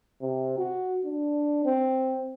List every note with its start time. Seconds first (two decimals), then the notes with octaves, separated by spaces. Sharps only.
0.22 C3
0.58 F#4
1.05 D4
1.65 C4